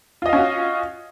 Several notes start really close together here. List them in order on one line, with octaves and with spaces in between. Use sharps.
F4 D#5 F5 C#4 F#4